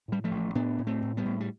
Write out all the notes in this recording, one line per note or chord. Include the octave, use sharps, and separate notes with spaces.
A2 G3
F3 A3
A1
A2 B3 D4
A2
A3 C4
A2
G3 B3
A2
G3